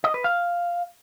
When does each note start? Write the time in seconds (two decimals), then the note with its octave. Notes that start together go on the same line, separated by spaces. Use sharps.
0.04 D#5
0.14 B4
0.24 F5